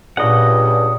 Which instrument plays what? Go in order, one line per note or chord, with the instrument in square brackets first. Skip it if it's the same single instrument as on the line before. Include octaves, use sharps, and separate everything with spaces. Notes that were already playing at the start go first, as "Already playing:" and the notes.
[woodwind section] C#2 G2 [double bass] A#2 [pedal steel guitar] D#5 F#5